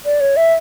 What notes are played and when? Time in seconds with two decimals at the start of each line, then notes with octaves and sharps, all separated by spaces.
0.05 D5
0.21 C#5
0.37 E5